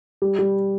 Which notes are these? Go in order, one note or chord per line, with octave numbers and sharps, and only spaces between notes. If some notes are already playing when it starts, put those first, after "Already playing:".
G3
G3